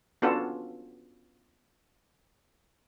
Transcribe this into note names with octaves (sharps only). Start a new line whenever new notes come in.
B3 C#4 D4 F4 F#4 A4